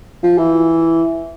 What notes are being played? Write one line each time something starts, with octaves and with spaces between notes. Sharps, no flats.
F3
E3